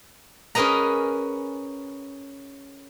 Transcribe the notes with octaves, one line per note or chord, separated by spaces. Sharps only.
C#4 G#4 A#4 B4 D#5 A#5